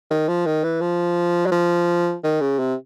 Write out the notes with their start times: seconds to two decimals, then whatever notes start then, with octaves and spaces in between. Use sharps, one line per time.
0.11 D#3
0.29 F3
0.46 D#3
0.64 E3
0.81 F3
1.46 F#3
1.52 F3
2.24 D#3
2.41 C#3
2.59 C3